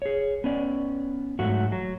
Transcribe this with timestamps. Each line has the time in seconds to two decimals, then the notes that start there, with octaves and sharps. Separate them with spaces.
0.02 G#4 C#5
0.44 B3 C#4 D5
1.39 G#2 F#3 A3 F#4 F#5
1.72 F#3